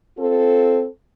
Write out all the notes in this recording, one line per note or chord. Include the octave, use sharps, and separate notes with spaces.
C4 F4 A4